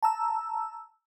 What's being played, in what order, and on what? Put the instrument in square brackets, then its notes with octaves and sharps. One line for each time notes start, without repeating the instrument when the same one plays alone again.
[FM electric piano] A5 A#5 E6